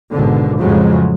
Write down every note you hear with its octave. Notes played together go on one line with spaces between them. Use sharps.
G#1 B2 D3
F2 A2 C#3 F#3 G#3